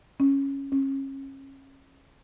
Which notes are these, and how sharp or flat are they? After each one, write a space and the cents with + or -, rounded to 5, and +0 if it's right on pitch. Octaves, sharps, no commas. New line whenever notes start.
C#4 -10
C#4 -35